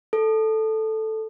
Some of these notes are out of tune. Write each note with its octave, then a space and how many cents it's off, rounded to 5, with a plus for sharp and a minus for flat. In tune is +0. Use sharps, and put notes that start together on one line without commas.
A4 +0